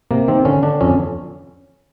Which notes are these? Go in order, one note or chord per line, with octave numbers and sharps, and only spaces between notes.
C3 A#3
D#3 C4
D3 C#4
D3 D4
F2 C#4